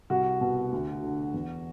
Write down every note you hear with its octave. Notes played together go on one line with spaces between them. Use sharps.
C2 F#4
B2
D2
D3
E2